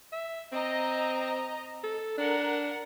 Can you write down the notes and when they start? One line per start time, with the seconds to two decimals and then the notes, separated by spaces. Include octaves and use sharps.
0.12 E5
0.52 C4 D#5 A#5
1.83 A4
2.18 D4 A#4 F#5